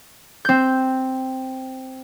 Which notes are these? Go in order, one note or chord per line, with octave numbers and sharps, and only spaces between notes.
C4 G6